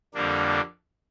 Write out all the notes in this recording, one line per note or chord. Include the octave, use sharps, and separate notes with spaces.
F2 D3 G3 A#3 D4